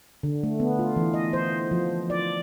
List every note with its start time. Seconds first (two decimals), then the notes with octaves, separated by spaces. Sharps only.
0.23 D3
0.43 A3
0.60 B3
0.79 F4
0.96 E3
1.14 D#5
1.33 C5
1.71 F3
2.10 D5